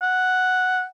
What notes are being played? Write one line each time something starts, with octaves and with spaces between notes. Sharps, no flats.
F#5